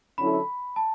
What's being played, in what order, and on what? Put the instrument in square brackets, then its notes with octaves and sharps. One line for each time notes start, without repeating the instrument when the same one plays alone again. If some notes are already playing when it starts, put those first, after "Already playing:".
[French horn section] D3 F#3 C#4 E4 A4 [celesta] B5
[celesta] A5